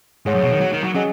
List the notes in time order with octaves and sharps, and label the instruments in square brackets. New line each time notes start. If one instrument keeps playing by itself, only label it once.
[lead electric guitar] G#2 [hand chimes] G#4 C#5 F#5
[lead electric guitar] F#2
B2
D#3
F#3
D#3
F#3
[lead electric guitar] F#3 [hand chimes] C#4 G#4 D#5 G#5